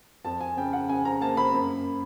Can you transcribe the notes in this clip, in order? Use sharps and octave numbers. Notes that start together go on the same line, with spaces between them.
F2 A5
G#5
C#3 G5
F#5
C#3 G#5
A#5
A#3 A5
B5
F#2